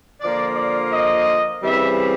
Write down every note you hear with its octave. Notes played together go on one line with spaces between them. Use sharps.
D3 F3 A#3 D5
D5
D#5
C#3 E3 G3 C4 E5